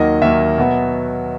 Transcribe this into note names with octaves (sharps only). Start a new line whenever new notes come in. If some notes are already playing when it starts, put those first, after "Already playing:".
Already playing: D#2 D#3 F#3 A#3 D#5
D#2 D#3 F#3 A#3 E5
B2 F#3 B3